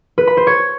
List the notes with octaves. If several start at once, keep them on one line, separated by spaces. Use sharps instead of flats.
B4
B5
C5
C#5